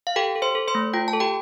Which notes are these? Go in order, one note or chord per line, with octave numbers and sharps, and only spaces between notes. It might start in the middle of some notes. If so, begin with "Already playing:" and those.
F5
G4 A4 G5
A4
C5 C6
A4
C5 C6
A3
F4 G5
A5
A4
G4 G5